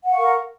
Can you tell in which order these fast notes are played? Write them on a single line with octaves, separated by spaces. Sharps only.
F#5 F5 C#6 A#4